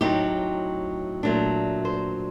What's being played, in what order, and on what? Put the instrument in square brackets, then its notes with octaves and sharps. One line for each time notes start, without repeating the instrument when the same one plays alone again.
[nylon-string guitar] A2 F#3 C4 D#4 G4
A#2 F#3 A3 D4
C5